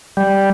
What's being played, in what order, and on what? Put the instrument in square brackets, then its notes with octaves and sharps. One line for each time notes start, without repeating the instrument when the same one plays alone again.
[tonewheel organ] G3